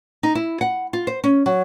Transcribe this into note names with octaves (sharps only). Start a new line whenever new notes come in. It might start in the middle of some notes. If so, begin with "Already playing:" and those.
D#4
E4
F#5
F4
C5
C#4
F#3